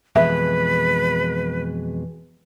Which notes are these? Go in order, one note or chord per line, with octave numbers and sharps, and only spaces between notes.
F2 B2 E3 G#3 B4 E5